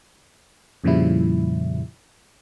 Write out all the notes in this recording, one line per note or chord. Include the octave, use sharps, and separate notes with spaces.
F2 A#2 C#3 F3 G3 E4